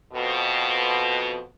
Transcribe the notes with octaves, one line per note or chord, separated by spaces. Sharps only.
F2 B2